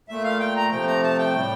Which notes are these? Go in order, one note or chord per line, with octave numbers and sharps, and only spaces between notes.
A#2 A3 E5
F5
G5
A#5
C3 F3 A3 G5
A#5
A5
G5
A2 G3